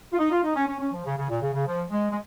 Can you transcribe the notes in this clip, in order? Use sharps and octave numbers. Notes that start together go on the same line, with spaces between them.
F4
D#4
F4
D#4
C#4
C#4
C#4
F3
C#3
C#3
A#2
C#3
C#3
F3
G#3
G#3